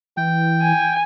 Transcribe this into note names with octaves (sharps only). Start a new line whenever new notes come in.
E3 G5
G#5